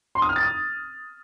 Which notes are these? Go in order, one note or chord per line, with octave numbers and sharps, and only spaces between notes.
C6
D#6
F6
A6
D#6